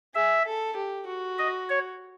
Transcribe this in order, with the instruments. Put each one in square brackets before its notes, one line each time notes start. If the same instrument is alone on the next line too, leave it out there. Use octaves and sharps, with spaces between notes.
[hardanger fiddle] G#4 [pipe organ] E5
[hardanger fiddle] A4
G4
F#4
[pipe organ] D#5
C#5